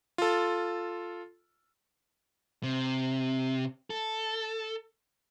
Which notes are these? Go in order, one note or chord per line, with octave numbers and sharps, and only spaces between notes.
F4 A4
C3
A4